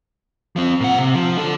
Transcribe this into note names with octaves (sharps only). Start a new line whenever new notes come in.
F3 C4
A#2 F#5
C3
F3
D3 A4